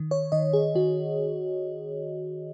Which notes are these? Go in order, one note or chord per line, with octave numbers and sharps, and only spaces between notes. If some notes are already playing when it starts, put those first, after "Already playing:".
Already playing: D#3
C#5
D#3 D#5
G#4
D#3 F#4